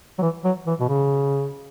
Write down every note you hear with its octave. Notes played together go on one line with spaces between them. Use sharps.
F#3
E3
F#3
E3
B2
C#3